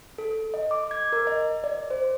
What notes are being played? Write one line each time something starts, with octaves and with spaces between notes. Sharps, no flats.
A4
D#5
D6
G#6
A#4
D#5
D5
C5